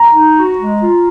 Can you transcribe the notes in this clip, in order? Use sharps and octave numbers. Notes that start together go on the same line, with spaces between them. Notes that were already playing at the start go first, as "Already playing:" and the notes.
Already playing: A#5
D#4
F#4
G#3
F4